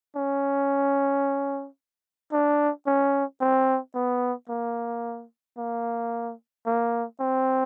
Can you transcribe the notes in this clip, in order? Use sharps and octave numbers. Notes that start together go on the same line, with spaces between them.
C#4
D4
C#4
C4
B3
A#3
A#3
A#3
C4